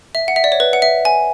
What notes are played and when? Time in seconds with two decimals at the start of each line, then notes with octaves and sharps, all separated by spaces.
0.15 E5
0.28 F#5
0.36 E5
0.44 D5
0.52 C#5
0.60 B4
0.73 F#5
0.82 E5
1.05 G#5